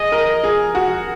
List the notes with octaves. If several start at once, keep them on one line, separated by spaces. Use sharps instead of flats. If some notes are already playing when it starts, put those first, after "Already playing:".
Already playing: G#4 D#5
A#4
G#4
F#4